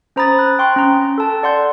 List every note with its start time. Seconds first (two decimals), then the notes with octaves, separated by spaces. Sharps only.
0.16 C#4 C5 A#5 B5 D#6 A6
0.39 F#6
0.59 G5 C6 C#6 F#6
0.76 C#4 A#5
1.18 A4 A5
1.43 D5 F#5 C6 G6